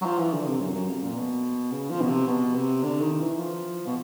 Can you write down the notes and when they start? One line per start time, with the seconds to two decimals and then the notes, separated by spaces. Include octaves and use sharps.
0.01 F#3
0.05 F3
0.19 E3
0.34 D3
0.47 C3
0.61 F#2
0.75 F#2
0.89 F2
1.03 A#2
1.17 B2
1.72 C#3
1.90 F3
2.01 B2
2.08 C3
2.27 B2
2.55 C3
2.83 D3
3.01 D#3
3.21 E3
3.38 F3
3.87 B2